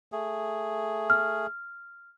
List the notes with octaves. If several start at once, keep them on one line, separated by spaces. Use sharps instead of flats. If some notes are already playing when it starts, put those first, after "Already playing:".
A3 G#4
F6